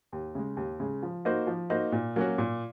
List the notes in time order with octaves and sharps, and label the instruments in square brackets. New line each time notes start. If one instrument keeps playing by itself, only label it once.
[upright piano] D#2
C#3 G#3
D#2
C#3 G#3
F3
A#3 D#4 F#4 C5
F3
A#3 D#4 F#4 C5
A#2
F#3 A#3 C#4 F#4
A#2